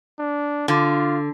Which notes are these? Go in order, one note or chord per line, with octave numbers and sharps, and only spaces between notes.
D4
D3 F4